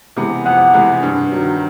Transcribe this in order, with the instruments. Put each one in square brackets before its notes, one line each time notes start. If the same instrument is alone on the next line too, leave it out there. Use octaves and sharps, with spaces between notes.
[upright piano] C3 E3 G#3 B3
[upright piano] F2 [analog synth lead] F#5
[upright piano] C3 E3 G#3 B3
G2
D#3 F#3